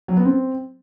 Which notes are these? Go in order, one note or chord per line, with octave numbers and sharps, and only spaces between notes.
F#3
B3
C4